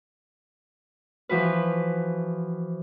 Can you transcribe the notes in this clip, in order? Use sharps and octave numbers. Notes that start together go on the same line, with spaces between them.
E3 F3 F#4 B4